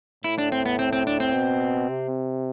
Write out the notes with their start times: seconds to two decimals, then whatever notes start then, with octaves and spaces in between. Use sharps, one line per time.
0.24 A2 E4
0.38 D4
0.52 C4
0.66 B3
0.79 C4
0.93 C4
1.07 D4
1.20 C4
1.34 B2
1.89 C3